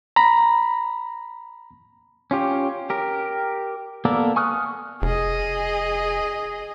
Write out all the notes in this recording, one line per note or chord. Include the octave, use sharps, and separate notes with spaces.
A#5 B5
C#4 F4 G4
G4 A#4
A#3 B3 A4 A#4 D5
G#5 C#6 D#6 F6 F#6
F1 G#4 D#5